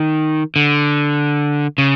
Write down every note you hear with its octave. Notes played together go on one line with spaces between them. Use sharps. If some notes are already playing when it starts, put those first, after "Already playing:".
Already playing: D#3
D3
C#3